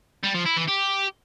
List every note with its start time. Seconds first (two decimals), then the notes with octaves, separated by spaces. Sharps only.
0.23 G3
0.34 F3
0.45 E4
0.57 E3
0.68 G4